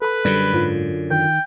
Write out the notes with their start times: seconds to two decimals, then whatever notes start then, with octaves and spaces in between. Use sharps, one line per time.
0.02 A4 B4 B5
0.25 F#2 D3 G3
0.54 G#2 F4
1.11 D#3 G5